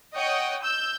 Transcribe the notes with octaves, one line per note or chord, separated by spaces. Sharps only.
C#5 D#5 F#5 G5
E6 G6